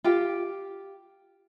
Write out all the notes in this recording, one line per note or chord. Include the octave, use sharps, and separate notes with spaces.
F4 G4